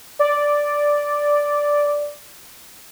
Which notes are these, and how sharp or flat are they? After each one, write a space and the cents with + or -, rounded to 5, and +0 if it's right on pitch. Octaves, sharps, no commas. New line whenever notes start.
D5 -5